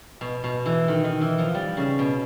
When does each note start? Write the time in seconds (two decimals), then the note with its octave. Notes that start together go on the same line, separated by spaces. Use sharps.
0.21 B2
0.44 B2
0.66 E3
0.88 D#3
1.04 D#3
1.21 E3
1.38 F3
1.55 G3
1.77 C#3
1.99 B2